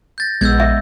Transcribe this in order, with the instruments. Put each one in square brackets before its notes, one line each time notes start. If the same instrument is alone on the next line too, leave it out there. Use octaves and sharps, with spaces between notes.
[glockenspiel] G6 A6 A#6
[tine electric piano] A#1 [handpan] G#3 B3 [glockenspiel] E6 G6 G#6
[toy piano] E5